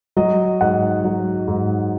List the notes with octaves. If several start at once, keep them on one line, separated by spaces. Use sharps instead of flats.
F#3 D#5
G#2 F#5
F#3
G#2